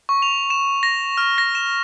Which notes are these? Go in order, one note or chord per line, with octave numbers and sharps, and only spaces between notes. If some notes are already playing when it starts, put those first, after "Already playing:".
C#6
F7
E7
A#6
F6
A#6
E7